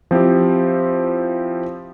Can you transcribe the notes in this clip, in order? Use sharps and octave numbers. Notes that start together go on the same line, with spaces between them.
F3 C4 E4 G4